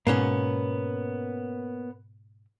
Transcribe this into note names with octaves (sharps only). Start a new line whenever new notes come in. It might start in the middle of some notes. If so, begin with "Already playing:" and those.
G#2 B2 A#3 B3 C#4